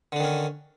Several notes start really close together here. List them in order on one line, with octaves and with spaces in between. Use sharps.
D3 D4 D#3 C#4